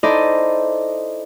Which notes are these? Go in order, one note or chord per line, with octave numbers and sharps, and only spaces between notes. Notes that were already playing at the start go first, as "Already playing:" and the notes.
D#4 E4 A4 C5 D5 D#5